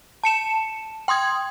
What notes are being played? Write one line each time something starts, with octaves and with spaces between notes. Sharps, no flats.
A5 C#7 E7
G5 C6 D#6 G#6